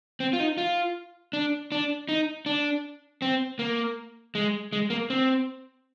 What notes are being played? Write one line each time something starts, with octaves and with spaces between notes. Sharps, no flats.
C4
F4
D#4
F4
D4
D4
D#4
D4
C4
A#3
G#3
G#3
A#3
C4